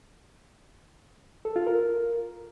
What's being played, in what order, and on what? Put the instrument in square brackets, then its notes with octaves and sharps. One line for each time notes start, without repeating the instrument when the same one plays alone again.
[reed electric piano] A4
F4
A#4